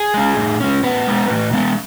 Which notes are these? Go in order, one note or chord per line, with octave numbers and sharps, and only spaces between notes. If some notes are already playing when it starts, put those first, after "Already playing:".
Already playing: G#4
G#3 C#4
A2
G#3 C#4
A2 B3 B4
G#3 B3
A2
G#3 B3